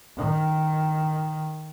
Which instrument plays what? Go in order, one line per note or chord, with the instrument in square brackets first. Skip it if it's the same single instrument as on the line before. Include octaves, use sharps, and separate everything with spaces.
[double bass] D#3